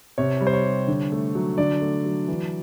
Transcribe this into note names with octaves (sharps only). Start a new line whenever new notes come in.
C3 C#5
G3
C5
C#5
G3
D3
A3
F#3
D3 D5
A3
F#3
E3